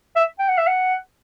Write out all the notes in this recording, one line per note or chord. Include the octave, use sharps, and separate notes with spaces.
E5
G5
F#5
E5
F#5